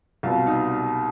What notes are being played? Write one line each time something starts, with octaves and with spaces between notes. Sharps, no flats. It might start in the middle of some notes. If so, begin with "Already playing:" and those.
C2 B2 F4
D#4